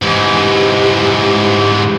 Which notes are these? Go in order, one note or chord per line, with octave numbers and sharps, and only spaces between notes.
G#2 E3 G4